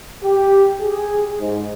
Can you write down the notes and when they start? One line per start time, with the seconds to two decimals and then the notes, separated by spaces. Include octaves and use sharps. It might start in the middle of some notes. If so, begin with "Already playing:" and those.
0.23 G4
0.80 G#4
1.40 G#2